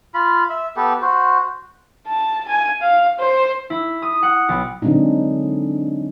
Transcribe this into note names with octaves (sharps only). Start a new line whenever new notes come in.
F4 B5
E5
B3 G4 A4
F#4 C5
A5
G#5
F5
C5
E4
D#6
F#5
B1
D3 F#3 G#3 C4 D4 D#4